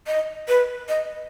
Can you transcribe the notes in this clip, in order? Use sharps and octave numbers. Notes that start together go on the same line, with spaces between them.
D#5
B4
D#5